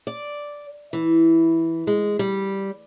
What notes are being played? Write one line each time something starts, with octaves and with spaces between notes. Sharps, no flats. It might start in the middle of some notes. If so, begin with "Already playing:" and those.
D5
E3
G#3
G3